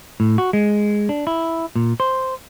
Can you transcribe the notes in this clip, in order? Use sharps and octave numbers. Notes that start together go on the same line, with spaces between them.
A2
F#4
G#3
D4
E4
A#2
C5